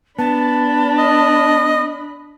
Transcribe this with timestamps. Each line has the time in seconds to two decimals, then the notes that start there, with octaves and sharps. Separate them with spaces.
0.19 B3 D4 A5 B5
0.98 D#5